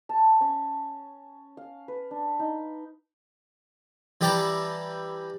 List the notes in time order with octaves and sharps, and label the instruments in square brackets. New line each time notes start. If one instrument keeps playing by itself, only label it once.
[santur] A5
C#4
F5
B4
D4
D#4
[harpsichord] E3 G3 G4 G5 A5 A#5